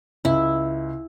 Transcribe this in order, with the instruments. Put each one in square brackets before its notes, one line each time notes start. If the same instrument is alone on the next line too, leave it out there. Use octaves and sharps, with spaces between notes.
[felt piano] C#2 [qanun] E4